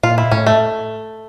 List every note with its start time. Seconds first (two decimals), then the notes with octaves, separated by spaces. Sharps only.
0.03 A#2 F4
0.18 E4
0.31 A2 C#4
0.47 A3